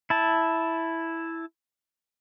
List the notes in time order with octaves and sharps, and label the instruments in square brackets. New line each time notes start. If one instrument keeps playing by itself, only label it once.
[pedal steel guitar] E4 A5